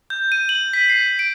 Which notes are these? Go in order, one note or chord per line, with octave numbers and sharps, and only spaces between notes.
G6
D#7
F#7
B6
C7
D7